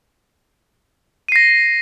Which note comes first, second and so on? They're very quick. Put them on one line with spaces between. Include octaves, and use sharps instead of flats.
D#7 C7 A#6